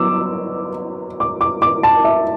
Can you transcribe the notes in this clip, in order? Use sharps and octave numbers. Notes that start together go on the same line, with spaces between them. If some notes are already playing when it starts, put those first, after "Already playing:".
Already playing: F#3 B3 D6 E6
D6
D6
D6
A5
E5